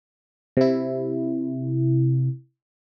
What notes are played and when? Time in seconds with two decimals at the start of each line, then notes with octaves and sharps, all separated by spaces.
0.57 C3 E4